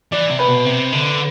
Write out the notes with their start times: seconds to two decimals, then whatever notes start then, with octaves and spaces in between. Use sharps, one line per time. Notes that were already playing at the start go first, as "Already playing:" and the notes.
0.12 E3 D5
0.31 C3
0.39 B4
0.48 B2
0.65 C3
0.92 D3